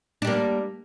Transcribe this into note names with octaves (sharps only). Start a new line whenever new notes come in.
G3 A#3 D4